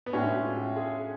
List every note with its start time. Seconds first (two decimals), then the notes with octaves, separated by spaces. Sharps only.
0.06 B3
0.13 A2 G#3 C#4 D4 F#4
0.45 F4
0.76 G#4